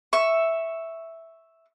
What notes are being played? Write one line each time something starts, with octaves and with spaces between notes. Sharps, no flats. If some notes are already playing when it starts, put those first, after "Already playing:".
E5 C#6